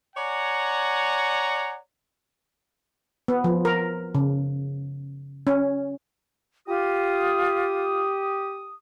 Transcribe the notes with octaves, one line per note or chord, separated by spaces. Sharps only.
C#5 D5 F#5 G#5 A#5
B3
F3
A#4
C#3
C#4
F4 G4 D#6